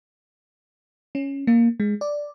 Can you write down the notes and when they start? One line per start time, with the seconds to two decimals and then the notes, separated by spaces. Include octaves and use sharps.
1.15 C#4
1.47 A#3
1.80 G#3
2.01 D5